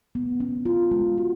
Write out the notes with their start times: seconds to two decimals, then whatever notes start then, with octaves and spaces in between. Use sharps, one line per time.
0.15 B3
0.40 C#4
0.65 F4
0.91 G#3
1.18 F#4